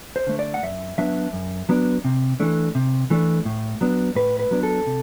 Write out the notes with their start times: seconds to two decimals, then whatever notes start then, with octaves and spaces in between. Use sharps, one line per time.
0.16 C5
0.27 D3 A3
0.39 D5
0.54 F#5
0.63 F#2 E5
0.98 F#3 B3 D4 E5
1.33 F#2
1.69 F#3 B3 D4
2.05 C3
2.40 E3 A3 D4
2.75 C3
3.10 E3 A3 D4
3.45 A2
3.81 F#3 B3 D4
4.15 A2 B4
4.39 B4
4.51 F#3 B3 D4
4.63 A4
4.87 C3